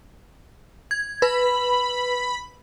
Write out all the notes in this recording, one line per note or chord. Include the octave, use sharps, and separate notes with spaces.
G#6
B4 B5